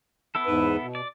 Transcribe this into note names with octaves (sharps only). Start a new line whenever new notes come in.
B3 E4 A4
E2 G#2 B4
B2
D5